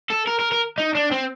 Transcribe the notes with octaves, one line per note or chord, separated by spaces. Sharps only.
A4
A#4
A#4
A#4
D#4
D4
C4